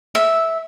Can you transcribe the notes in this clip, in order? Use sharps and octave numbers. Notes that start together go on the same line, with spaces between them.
E5